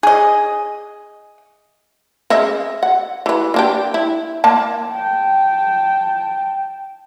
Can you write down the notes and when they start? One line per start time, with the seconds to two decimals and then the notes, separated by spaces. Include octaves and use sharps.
0.03 G#4 D#5
2.30 C#3 D#5 E5
2.83 F#5
3.26 E3 B4
3.54 A#3 D4 G4
3.94 E4
4.44 A#3 A5
4.91 G5 A5